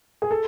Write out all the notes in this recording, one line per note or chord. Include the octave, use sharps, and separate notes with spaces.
G#4
A4